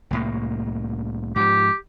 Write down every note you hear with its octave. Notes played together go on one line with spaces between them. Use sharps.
C2 A2 A#3
G#2 F3 G4